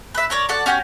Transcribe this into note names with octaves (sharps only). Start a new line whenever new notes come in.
B4 E5
A#4 C#5 D5
F#4 A4 D5 F#5
C#4 F#4 G4 G6